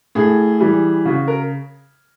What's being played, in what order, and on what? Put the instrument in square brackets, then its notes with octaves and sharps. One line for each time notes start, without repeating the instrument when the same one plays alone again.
[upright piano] A2 G#4
E3 G3
C#3 F#4
A#4